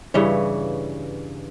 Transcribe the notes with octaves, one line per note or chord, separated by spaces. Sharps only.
G2 C#3 E3 C#5